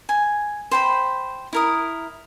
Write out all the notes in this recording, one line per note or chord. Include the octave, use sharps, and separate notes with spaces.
G#5
C5 G5 B5
E4 A#4 D#6